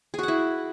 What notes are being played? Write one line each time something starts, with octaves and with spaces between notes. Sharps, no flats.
E4 F#4 G#4 F#5